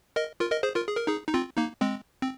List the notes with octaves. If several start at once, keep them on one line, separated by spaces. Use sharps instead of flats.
A#4 D#5
F4 A#4
A#4 D#5
G#4 C5
F4 A#4
G#4
A#4
D#4 G#4
D#4
C4 F4
A#3 D#4
G#3 C4
C4